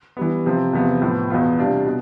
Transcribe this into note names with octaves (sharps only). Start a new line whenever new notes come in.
E3 G3 B3
C3 F3 C4
E2 C3 F3 B3
A2 F3 B3
E2 B2 B3 F4
C3 G3 D4 F4
B2